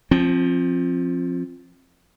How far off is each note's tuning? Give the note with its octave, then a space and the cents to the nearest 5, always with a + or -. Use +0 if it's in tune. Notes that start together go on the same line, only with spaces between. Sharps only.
F3 +0 C4 +30